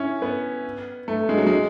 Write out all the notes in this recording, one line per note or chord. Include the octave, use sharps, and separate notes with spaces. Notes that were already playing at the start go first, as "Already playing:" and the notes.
Already playing: C#4 E4
B3
A3
G#3
F#3
G#3